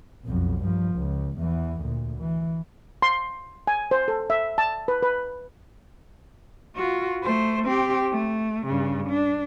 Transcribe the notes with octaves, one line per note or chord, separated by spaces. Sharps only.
B1 F2
G2 F3
C#2
E2 E3
D2 A#2
E3
C6
G#5
C5
A4
E5
A5
B4
B4
F4 F#4
A3 C5
C4 G4
A3
G2 C#3
D4